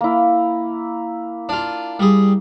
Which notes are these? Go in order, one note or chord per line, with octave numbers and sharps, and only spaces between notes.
A#3 E4
D4 F4
G3 G#4